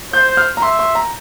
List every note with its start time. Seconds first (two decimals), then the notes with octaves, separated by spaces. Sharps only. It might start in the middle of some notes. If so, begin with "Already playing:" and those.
0.13 C5 G6
0.37 F6
0.57 A#5
0.62 E5 C6
0.79 C6
0.95 A#5